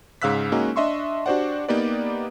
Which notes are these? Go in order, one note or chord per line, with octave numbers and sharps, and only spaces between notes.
G#2 C#3 F5 E6 F#6 B6
G#3 A#3 C#4 D#4 F#4
D4 D#5 E5 C6 C#6
D4 F#4 G4 C5 D5 F#5
A#3 B3 D#4 G4 B4 D5